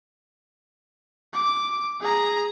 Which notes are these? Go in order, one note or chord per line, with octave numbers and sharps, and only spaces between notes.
D6
G#4 A#5